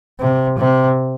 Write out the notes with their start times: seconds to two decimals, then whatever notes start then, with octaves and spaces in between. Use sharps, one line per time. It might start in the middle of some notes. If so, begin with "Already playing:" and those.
0.20 C3
0.59 C3